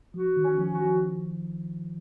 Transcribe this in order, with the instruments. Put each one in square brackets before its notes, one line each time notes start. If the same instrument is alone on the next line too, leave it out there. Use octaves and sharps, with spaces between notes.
[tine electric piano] F3 [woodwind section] F#4
[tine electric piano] D#3
[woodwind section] C#4
[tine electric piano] F3
[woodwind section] F#4
[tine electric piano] F3